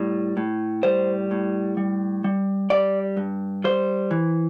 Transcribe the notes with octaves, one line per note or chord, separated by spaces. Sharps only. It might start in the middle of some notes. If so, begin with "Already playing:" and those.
Already playing: A2 G3
A2
G3 C5
A2
G3
G3
G3 D5
G2
G3 C5
E3